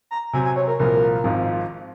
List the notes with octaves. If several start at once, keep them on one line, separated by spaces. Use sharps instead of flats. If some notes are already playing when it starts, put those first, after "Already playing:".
A#5
C3 F#3 C4 G#5
G#5
C#5
A#4
C2 A#2 F3 A#4
G#1 G#2 F3 C4 F4